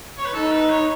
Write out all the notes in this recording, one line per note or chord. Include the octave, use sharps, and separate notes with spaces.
C#5
B4
D#4 A4
B4
C#5